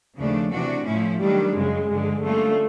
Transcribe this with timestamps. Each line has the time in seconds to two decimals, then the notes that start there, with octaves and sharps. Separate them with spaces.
0.17 D#2 C#3 F3 A3 D4
0.51 C3 E3 A3 D4 F#4
0.85 A2 F3 A3 C#4 E4
1.20 D#3 F#3 G3 A3 D4
1.54 F#2 C#3 F#3 G#3
1.88 G2 D3 F3 G#3
2.23 D3 G3 A3 A#3 C#4 F4